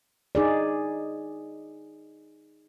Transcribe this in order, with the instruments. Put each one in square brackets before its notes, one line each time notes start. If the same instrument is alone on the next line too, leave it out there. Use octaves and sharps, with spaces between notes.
[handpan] D#4 G#4 D5